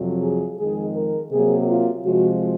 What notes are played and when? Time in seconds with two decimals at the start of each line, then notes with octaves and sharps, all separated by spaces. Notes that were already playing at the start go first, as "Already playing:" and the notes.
Already playing: F2 C3 F#3
0.22 G#4
0.59 F2 D#3 G#3 G#4
0.96 A#4
1.31 C3 F#3 A#3 G#4
1.68 F4
2.04 C3 F3 G#3 F#4